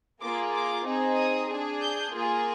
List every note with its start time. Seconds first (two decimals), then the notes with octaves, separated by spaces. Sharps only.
0.22 A#3 F4 G#4 D6
0.54 D6
0.86 C4 D#4 G#4
1.17 D#6
1.49 D4 G#4
1.81 G6
2.12 A#3 F4 G#4